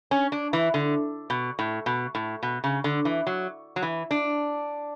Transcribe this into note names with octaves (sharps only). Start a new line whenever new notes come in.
C#4
D4
E3
D3
B2
A2
B2
A2
B2
C#3
D3
E3
F#3
F#3
E3
D4